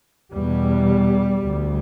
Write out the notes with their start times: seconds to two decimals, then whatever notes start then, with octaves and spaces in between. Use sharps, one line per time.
0.33 E2 B2 G3
1.43 D2